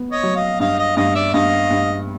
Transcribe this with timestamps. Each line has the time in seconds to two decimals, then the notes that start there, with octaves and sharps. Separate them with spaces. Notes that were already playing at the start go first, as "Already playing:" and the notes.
Already playing: B3
0.12 C#5 D#5
0.23 F#3
0.35 D#5 F5
0.60 G2 D#5 F5
0.78 D#5 F5
0.97 G2 D#5 F5
1.15 D5 E5
1.33 G2 D#5 F5
1.70 G2